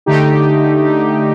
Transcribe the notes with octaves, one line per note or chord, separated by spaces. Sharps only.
D3 A3 D#4 G4